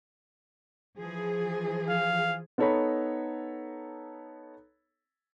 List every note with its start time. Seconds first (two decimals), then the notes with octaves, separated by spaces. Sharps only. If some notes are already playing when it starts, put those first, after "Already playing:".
0.98 E3 F3 G#4
1.89 F5
2.58 B3 D#4 A4 C#5 A#5 B5